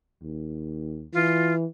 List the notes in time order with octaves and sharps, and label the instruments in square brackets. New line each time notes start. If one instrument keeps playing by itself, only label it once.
[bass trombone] D#2
[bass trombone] E3 [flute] F4